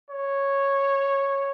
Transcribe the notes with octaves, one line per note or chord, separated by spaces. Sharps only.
C#5